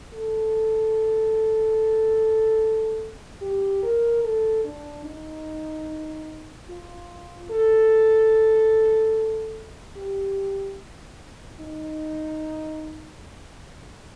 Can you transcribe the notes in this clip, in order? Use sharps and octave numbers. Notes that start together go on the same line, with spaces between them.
A4
G4
A#4
A4
D4
D#4
F4
A4
G4
D#4